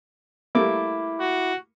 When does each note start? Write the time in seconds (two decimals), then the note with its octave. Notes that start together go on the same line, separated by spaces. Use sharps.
0.55 G3 A3 A#3 E4 D6
1.20 F#4